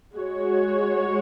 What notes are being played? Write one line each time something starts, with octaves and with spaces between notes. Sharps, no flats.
G#3 F#4 C#5